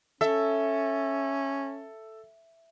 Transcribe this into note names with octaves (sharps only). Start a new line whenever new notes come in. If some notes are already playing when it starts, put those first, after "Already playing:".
C#4 A4 E5